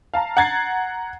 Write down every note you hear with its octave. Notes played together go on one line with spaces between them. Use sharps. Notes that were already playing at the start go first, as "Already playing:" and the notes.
F5 A5 A#5
F#5 A#5 G#6 A6 C7